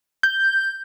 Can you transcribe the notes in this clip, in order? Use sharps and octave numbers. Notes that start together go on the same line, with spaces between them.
G6